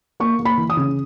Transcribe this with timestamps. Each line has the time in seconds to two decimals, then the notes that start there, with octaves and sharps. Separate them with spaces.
0.20 A#3 C#6
0.40 A#3
0.45 B5
0.57 E3
0.70 D#6
0.77 C#3